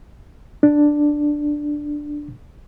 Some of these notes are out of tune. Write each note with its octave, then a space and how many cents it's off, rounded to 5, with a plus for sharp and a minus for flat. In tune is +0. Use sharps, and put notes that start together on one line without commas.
D4 +5